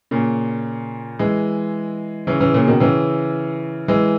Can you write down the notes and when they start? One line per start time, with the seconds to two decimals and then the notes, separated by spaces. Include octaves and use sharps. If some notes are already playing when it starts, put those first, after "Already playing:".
0.11 A#2 C#3
1.19 E3 G#3
2.27 C#3 E3
2.40 C#3 E3
2.54 A#2 C#3
2.68 B2 D#3
2.80 C#3 E3
3.88 E3 G#3